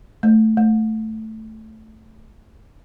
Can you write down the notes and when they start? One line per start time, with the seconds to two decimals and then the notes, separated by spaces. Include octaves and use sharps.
0.23 A3
0.57 A3